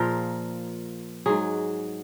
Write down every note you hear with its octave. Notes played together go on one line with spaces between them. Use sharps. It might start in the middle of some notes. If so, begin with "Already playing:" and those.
Already playing: A#2 F3 G#4 A#4
G#2 F#3 G#4